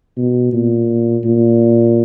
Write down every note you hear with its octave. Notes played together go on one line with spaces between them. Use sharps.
B2
A#2
A#2